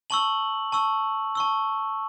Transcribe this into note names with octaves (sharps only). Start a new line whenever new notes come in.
A5 C#6 E6 F#7
A5 C#6 E6
A5 C#6 E6